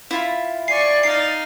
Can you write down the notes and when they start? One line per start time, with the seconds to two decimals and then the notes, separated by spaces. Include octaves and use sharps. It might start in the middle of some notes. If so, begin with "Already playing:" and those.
0.11 E4 F4 B5
0.68 D5 G#5 C#6 C7
1.03 D#4 F5 C7